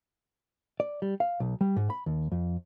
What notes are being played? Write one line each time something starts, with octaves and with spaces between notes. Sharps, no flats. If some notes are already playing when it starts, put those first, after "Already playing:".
D5
G3
F5
B1
G3
G#2
B5
D#2
F2